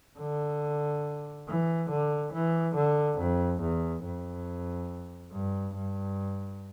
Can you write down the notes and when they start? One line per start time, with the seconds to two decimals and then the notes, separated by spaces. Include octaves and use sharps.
0.19 D3
1.48 E3
1.90 D3
2.33 E3
2.75 D3
3.19 F2
3.62 E2
4.04 F2
5.32 G2
5.75 G2